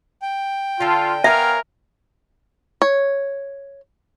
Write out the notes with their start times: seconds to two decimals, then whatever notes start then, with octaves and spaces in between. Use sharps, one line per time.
0.22 G5
0.80 D3 F4 A4
1.24 B3 A#4 C#5 E5 F5 G#5
2.82 C#5